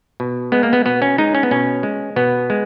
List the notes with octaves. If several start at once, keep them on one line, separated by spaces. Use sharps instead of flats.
B2
G#3 B3
A#3
B3
B2 B3
C#4
G#3 D#4
C#4
B3
B2 C#4
G#3
B2 B3
G#3